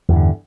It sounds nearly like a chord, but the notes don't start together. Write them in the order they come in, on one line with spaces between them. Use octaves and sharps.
E2 G2 D3